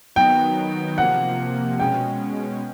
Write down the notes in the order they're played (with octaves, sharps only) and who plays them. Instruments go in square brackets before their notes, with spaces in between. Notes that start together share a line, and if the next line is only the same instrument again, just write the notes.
[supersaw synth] D#3 F#3 B3 D#4 [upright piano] G5
[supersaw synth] C3 F3 A#3 [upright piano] F#5
[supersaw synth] B2 G#3 C#4 [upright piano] G5